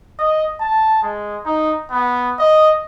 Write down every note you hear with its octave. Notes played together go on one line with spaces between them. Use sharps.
D#5
A5
G#3
D#4
B3
D#5